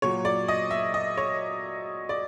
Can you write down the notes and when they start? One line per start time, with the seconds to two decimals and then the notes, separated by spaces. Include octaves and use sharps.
0.02 A#2 F#3 C#5
0.25 D5
0.48 D#5
0.71 E5
0.94 D#5
1.17 C#5
2.09 D5